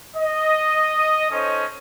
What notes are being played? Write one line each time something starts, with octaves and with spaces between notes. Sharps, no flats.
D#5
C#4 D#4 A4 C5 C#5 D#5